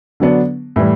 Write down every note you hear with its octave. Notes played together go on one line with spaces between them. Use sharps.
D3 F#3 B3 D4
A2 E3 G3